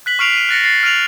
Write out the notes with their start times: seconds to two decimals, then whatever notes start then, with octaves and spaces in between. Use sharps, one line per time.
0.06 F#6 B6 F#7
0.19 C#6 F6 C7 D7 F7
0.33 B6 D#7
0.49 F#6 A6 A#6 C#7
0.64 A6 C7
0.83 F6 D7 D#7 F7 F#7